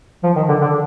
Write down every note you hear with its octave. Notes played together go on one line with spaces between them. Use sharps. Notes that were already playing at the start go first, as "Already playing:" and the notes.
F3
D#3
D3
D3